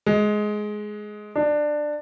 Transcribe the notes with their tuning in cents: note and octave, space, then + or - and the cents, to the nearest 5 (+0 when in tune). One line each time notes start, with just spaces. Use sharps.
G#3 +15
D4 +15